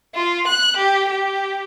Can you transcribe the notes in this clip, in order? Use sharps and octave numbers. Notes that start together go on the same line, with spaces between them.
F4
F#6
G4
G4